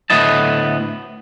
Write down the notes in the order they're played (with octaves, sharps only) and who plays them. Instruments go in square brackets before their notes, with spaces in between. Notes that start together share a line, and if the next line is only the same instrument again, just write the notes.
[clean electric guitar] D2 A2 B3 E4 D#5 A5